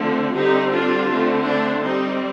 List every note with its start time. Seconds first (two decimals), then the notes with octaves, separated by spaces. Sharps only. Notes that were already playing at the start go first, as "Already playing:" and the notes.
Already playing: D3 F3 A3 C4
0.35 D3 G3 C4 D#4 G4
0.72 D4 F4
1.10 D3 A3 C4
1.47 D4
1.84 G3 C4 D#4